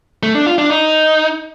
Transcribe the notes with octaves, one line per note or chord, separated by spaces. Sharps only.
A3
D4
F4
D4
D#4